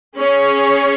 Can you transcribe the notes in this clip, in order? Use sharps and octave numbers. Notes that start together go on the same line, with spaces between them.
C#4 G#4 C#5